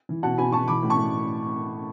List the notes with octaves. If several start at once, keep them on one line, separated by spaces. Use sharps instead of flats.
E3
B2 F#5 A5
B2 G#5 B5
B2 A5 C#6
E3 B5 D6
A2
A5 C#6
A2